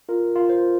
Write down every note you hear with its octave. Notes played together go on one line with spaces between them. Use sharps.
F4 A#4
F4
C5